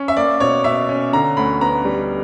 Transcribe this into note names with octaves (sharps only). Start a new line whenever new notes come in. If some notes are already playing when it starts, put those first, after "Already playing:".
Already playing: C#4
E5
A#3 D5
B2 C#5
B2 E5
C#4
D3 A#5
D2 B5
B3 A#5
G3